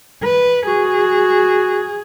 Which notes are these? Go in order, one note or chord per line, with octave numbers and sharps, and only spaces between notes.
B4
F#4 G#4